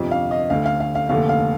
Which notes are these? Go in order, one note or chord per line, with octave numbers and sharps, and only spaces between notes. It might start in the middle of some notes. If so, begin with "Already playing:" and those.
Already playing: G1 F2 C3 F3
F5
D#5
D2 D3 A3 F5
F5
F5
F5
F1 D#2 D3 A3 F5
F5